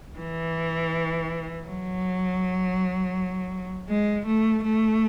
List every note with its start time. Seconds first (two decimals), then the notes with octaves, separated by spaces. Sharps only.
0.18 E3
1.67 F#3
3.89 G#3
4.26 A3
4.64 A3